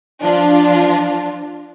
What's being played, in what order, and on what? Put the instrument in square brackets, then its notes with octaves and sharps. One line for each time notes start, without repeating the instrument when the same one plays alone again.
[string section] F3 D4 F4